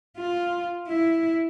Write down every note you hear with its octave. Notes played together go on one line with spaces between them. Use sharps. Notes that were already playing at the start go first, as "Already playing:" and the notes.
F4
E4